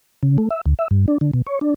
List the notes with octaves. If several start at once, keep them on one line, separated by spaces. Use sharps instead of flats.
C#3
A3
E5
D2
E5
G2
D4
D3
B2
C#5
D4